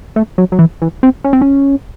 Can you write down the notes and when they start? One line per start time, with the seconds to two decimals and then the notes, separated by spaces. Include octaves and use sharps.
0.16 A3
0.38 F#3
0.52 F#3
0.59 E3
0.82 E3
1.03 C4
1.24 C#4
1.33 C4
1.41 C#4